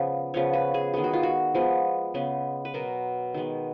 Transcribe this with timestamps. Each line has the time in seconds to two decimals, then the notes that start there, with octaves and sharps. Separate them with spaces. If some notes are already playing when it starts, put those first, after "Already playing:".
Already playing: C#3 F3 B3
0.34 C#3 F3 B3 C#5
0.53 B4
0.74 G#4
0.94 D#3 G#3 B3 G#4
1.04 F#4
1.13 F4
1.23 F#4
1.54 F3 G#3 B3
2.14 C#3 G#3 B3
2.65 B4
2.74 B2 F#3 B3 A#4
3.34 D#3 G#3 B3